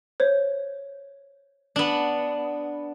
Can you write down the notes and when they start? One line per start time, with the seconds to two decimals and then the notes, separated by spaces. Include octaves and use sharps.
0.20 C5 C#5
1.76 B3 D4